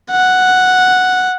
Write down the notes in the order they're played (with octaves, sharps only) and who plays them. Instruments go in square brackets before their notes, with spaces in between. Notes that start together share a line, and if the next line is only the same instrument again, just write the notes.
[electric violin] F#5